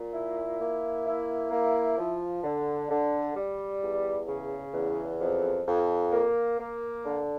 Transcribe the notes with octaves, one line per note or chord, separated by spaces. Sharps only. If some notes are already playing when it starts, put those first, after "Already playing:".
Already playing: A#2
E4
A#3
E4
A#3
F3
D3
D3
G3
E2
C#3
E2
F2
F2
A#3
A#3
D3